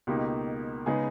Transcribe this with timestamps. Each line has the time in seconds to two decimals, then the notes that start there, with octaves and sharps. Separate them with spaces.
0.07 C#2 B2 A#3 D#4 G4
0.86 C#3 G#3 B3 D#4 G#4